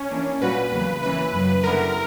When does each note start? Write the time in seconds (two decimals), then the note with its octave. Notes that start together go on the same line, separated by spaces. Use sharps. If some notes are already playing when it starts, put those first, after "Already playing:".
Already playing: C#4
0.10 E3 A#3 D4
0.42 A#2 G3 C#4 F#4 B4
0.72 E2 C#3 F#3 A#3
1.02 E3 A#3 C#4 E4 B4
1.33 F#2 C#3 F#3
1.64 D3 G3 B3 E4 A#4